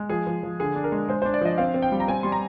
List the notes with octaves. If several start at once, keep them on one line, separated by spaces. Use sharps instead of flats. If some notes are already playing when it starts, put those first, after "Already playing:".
Already playing: G#3
F3 G#4
F3
F3
D3 G#4
D4
A#4
G#3
G#3 C5
D4 C5
D5
F3 D#5
C4 F5
C4
G5
G3
A#5
C4 G#5
G3 C6
A#5